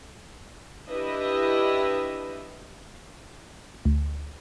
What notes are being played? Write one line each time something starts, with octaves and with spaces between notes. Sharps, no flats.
D4 E4 G4 B4 D#5 E5
D2